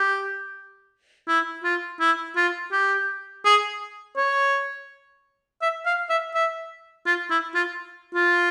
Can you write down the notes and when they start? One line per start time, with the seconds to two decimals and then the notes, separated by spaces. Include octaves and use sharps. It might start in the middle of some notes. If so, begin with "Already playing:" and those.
Already playing: G4
1.28 E4
1.64 F4
2.00 E4
2.36 F4
2.72 G4
3.45 G#4
4.17 C#5
5.61 E5
5.86 F5
6.10 E5
6.34 E5
7.06 F4
7.30 E4
7.54 F4
8.14 F4